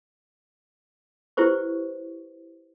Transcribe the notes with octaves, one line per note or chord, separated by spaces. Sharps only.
E4 G4 B4 C5 C#6